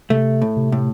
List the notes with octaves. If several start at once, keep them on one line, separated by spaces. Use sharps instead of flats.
C3 A3
A2
C3
A2